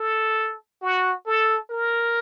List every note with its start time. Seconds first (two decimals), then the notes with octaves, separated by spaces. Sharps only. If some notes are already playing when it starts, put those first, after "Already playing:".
Already playing: A4
0.82 F#4
1.26 A4
1.70 A#4